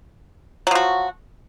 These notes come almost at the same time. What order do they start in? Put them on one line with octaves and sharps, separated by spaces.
F#3 F3 F#4